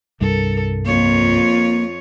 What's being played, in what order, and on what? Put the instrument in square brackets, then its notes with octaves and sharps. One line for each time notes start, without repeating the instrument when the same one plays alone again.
[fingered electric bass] C2 G2 [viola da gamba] A4 A#4
[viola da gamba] F2 F4 C#5 [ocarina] A#3